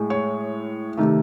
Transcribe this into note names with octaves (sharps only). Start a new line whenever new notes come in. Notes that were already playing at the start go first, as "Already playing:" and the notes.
Already playing: A2 G#3
C#5
C3 D#3 A3